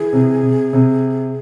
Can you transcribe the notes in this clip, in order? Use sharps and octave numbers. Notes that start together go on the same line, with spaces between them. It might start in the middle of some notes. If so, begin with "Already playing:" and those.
Already playing: E3 G#4
C3
C3
C3